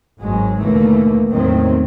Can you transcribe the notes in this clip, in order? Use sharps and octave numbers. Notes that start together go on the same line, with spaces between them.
G#1 G#2 F#3 G#3
D#2 B2 D3 E3 A3 A#3
E2 A2 D#3 F#3 A3 C4